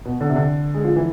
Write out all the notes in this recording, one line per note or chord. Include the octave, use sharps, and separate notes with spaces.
B2
D3
C3
D3
G#3
F3
E3